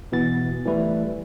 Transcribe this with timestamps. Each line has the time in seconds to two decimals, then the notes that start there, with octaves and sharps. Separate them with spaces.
0.12 B2 E3 B3 A6
0.66 E3 G3 A3 E4 B4